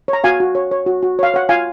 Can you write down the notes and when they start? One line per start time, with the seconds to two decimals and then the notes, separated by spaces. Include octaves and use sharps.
0.08 C#5
0.13 A#5
0.24 F#4 F5 G#5
0.40 F#4
0.55 C#5
0.71 C#5
0.86 F#4
1.03 F#4
1.19 C#5 F5
1.34 C#5 F#5
1.49 F4 F5 G#5